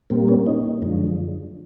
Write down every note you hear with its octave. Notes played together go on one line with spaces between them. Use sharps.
A#2 G3 A#3 C4
B3 C#4
C#4 D#4
F#2 D3 F3 G#3